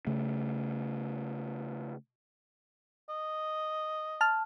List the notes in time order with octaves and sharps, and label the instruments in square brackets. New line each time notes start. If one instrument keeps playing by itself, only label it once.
[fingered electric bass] C#3 A3
[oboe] D#5
[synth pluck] A5 F6